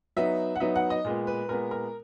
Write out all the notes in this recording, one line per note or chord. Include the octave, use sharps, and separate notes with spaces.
F#3 B3 D#4 E5
F#5
F#3 B3 D#4 E5
F#5
D#5
A#2 G#3 B3
B4
A#2 G#3 B3 A#4
A#4